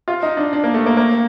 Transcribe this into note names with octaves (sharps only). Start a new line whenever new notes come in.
F4
D#4
D4
D4
A#3
A3
A#3
A#3